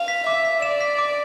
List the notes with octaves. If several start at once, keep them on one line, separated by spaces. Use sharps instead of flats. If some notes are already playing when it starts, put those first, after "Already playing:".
Already playing: F5
B6
E5 D6
B6
D5 E7
B6
D6